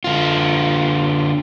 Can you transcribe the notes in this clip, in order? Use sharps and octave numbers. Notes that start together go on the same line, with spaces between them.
D3 F4